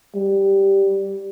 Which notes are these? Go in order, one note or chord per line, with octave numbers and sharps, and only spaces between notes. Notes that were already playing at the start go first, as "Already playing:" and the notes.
G3